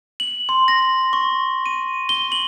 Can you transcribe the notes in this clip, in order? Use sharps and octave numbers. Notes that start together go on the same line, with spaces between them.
F#7
C6
A#6
C#6
D#7
G7
F#7